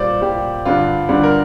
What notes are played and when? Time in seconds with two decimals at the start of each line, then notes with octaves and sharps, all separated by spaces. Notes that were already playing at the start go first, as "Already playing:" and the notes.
Already playing: A#2 G3 C5 D5
0.22 A#2 G3 G4
0.65 G2 D3 G3 F4
1.09 G2 D3 G3
1.23 A#4